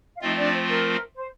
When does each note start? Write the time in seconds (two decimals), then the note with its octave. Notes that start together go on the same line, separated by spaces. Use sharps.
0.17 F5
0.21 F3 A3 C4 D#4 F4 D#5
0.37 D4 D5
0.53 C5
0.68 A#4
1.15 C5